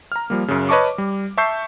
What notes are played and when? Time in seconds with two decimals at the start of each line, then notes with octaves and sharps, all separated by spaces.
0.12 A#5 F6
0.30 F3 G3 A#3
0.48 F#2 C#3
0.69 B4 C#5 D#5 A5 C#6 D6
0.98 G3
1.37 E5 A5 C#6 E6 G6 C7